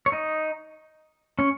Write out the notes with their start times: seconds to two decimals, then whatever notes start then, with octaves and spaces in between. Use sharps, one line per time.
0.06 C#5
0.12 D#4 D#5
1.39 C#4 C#5